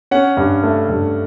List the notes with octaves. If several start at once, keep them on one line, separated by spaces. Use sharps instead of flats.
C#4 F#5
G2
A3
G2